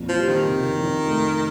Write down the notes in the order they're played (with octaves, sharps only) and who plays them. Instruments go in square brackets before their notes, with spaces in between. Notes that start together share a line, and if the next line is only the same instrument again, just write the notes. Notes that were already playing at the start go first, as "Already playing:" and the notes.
Already playing: [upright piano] F2 A#2
[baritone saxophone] F3
[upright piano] G3
[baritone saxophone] D#3
[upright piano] C3
F2
A3